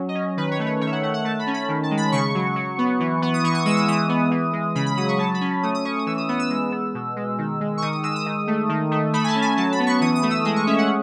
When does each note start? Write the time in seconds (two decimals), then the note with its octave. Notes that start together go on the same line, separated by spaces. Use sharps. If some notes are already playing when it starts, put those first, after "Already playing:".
Already playing: F#3 C#4
0.09 D#5
0.15 C#4
0.37 D#3 B4
0.51 C#5
0.59 A3 B4
0.67 C#5
0.81 D#3 C#5
0.87 E5
0.92 F#5
1.03 A3 F#5
1.14 F#5
1.25 A3 A5
1.39 B5
1.47 C#4
1.54 B5
1.69 D#3
1.83 A5
1.91 G#3
1.97 B5
2.12 C#3 C#6
2.35 F#3
2.56 F#3
2.78 B3
3.00 E3
3.22 B3
3.34 D#6
3.44 E3 C#6
3.54 D#6
3.65 G#3 E6
3.77 D#6
3.88 E3 D#6
4.09 B3
4.31 E3
4.53 G#3
4.75 C#3 B5
4.86 B5
4.97 F#3 D#6
5.08 C#6
5.19 F#3 A5
5.34 B5
5.41 C#4
5.63 A3 D#6
5.75 D#6
5.85 C#4 C#6
5.99 D#6
6.07 E3 E6
6.18 D#6
6.29 B3 D#6
6.39 E6
6.50 G#3 E6
6.72 B3
6.95 B2
7.16 G#3
7.38 D#3
7.61 G#3
7.77 C#6
7.82 D#3 D#6
7.93 D#6
8.03 G#3 E6
8.16 D#6
8.26 D#3
8.47 A3
8.69 D#3
8.91 A3
9.13 A3 B5
9.24 G#5
9.28 A5
9.35 C#4
9.42 G#5
9.57 F#3 A5
9.72 B5
9.80 B3
9.86 C#6
10.01 E3 D#6
10.16 D#6
10.23 A3
10.30 E6
10.45 G#3 D#6
10.56 C#6
10.67 C#4 E5
10.78 F#5